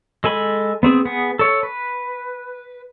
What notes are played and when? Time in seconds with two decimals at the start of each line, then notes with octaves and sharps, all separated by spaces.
0.24 G#3 A4 G#5 B5
0.83 B3 C4 G#4
1.05 B3 G#4
1.39 A4 C#5
1.63 B4